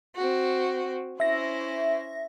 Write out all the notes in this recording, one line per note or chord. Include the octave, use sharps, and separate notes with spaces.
C4 F#4
C#4 E4 C5 E5 A#6